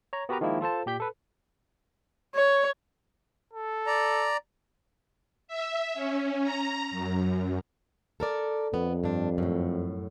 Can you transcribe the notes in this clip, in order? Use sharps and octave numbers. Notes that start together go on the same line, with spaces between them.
C#5 A#5
B3 F#4 G4 A#4 B4 A#5
D#3 F3 G#3 A#3 E4
F4 A4 C5 A5
A#2 G4 G6 B6
A4 B4
C#5
A4
D5 A#5
E5
C#4
A#5
F#2
A4 A#4 D5
F2 B3
G2 D4
F#2 A2